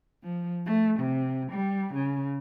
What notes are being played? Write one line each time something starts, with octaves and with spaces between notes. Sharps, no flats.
F3
A3
C3
G3
C#3